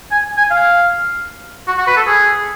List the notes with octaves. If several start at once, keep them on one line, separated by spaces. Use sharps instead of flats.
G#5
G#5
F5
F#4
F#4
B4
A4
G#4